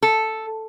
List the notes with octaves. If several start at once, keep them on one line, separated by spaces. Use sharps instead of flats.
A4